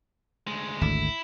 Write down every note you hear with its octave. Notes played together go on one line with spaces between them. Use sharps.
D2 G#3
G#1 D2 D3 E4